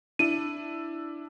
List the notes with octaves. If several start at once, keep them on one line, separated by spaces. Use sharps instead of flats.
D4 E4 D#7